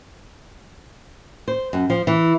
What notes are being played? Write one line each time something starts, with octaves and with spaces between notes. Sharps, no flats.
C5
F#2
F3
E3